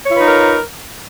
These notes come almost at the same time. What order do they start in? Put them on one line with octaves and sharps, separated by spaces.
C#5 F4 B4 D#4 A#4